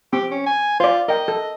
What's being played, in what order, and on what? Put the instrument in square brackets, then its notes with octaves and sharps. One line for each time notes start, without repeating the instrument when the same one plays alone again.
[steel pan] C4 [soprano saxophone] G4
[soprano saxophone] C#4
G#5
[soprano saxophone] F4 [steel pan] C5 D5
[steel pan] A#4 G5 [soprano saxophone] D#5
[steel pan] A4